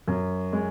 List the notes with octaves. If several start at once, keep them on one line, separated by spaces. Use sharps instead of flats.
F#2
G#3